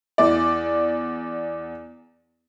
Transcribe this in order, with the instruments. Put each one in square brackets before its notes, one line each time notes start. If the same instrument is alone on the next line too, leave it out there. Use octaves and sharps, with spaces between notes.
[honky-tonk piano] E2 D5